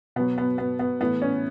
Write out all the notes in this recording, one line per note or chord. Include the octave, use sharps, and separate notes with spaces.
B2 F#3 B3
B3
B3
B3
A2 E3 B3
C#4